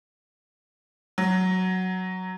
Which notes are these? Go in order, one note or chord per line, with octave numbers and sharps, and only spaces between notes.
F#3